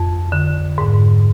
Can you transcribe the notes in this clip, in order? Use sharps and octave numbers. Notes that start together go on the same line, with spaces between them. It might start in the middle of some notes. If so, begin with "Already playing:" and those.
Already playing: F2
D3
G#2